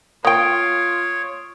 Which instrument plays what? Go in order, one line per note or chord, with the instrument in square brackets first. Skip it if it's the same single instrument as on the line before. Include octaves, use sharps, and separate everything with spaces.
[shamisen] A#3 G5 [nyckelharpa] F4 [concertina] C#5 [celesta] D#6 D7